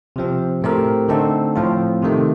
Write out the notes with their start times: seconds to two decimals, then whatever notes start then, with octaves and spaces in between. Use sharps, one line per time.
0.16 C3 F3 C4
0.62 A2 A3 C4 G4 A#4
1.08 D3 A3 C4 D#4 A4
1.56 A2 F3 C4 F4
2.03 C3 D#3 A3